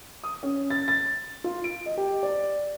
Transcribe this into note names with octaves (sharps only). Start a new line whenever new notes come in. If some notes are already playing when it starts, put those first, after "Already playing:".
D#6
C#4
A6
A6
F4
D7
D#5
G4
D5